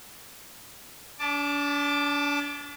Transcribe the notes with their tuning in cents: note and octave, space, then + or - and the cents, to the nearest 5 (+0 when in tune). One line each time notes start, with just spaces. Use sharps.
D4 -40 A5 +0 D6 +10